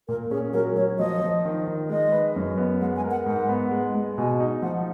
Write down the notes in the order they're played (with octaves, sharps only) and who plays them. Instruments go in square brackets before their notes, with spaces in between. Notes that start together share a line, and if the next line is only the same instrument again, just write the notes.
[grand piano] A#2 [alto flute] A#4
[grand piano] C#4 [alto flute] G#4
[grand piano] F#3 [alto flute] A#4
[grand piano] F#3 [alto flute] C#5
[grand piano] F3 [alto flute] D#5
[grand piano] F3
D#3
D#3
[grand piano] G#3 [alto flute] D#5
[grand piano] B4
F#2
B3
[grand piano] G#3 [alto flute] F#5
[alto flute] G#5
[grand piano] A#4
[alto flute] F#5
[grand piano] G#2 [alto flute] F#5
[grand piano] B3
G#3
G#3
[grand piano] B2 [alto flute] G#5
[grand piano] D#4
[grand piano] F3 [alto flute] F#5